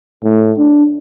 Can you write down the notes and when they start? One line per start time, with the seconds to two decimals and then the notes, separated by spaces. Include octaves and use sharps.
0.24 A2
0.58 D4